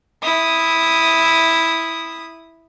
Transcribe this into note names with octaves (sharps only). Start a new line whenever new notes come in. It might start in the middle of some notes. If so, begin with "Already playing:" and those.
E4 D#6